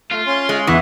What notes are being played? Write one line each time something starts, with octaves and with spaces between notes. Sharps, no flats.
A3 F4
C#4 C6
G#3
E2 E3 F#5 C#6 D#6